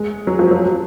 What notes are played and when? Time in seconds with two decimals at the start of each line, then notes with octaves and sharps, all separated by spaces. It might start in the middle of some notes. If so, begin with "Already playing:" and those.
Already playing: G#3
0.27 F#3
0.39 F3
0.51 F#3